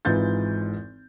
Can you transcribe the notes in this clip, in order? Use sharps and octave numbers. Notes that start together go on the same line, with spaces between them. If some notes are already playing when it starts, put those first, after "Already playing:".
G#1 G#2 E3 F4 G6 A6